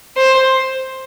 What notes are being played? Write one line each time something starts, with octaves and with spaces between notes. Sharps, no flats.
C5